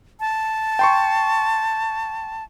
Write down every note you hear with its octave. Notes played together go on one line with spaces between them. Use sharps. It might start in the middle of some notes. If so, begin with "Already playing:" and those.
A5
G5 C6 C#6